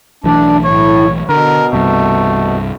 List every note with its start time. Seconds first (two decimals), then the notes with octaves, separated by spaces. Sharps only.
0.24 B1 E3 A3 D4
0.65 A2 C#5
1.29 B2 D3 A#4
1.73 C2 G2 C3 A3